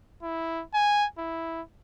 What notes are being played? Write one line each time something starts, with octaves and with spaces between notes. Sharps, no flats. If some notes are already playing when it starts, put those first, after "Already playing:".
E4
G#5
E4